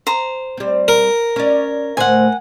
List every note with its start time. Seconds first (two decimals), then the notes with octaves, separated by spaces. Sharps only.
0.07 C5 A#5
0.58 G3 C4
0.88 A#4
1.36 C#4 D5
1.97 D2 A2 C5 F#5 G#5